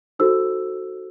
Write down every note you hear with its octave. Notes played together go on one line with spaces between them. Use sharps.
D#4 F#4 A4 C5 E6